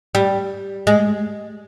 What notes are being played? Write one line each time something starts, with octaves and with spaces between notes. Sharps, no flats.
G3
G#3